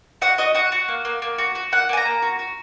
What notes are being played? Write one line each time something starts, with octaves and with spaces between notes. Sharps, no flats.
F#4 F#5
F#4 D#5
F#4 F#5
F#4
A#3
A#3
A#3
F#4
F#4
A#3 F#5
A#3 G#5
A#5
A#3
F#4
F#4